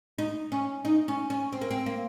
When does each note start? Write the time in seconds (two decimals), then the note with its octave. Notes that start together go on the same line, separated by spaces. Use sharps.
0.18 D#4
0.52 C#4
0.85 D#4
1.08 C#4
1.30 C#4
1.53 C4
1.61 A#3
1.71 C4
1.86 A#3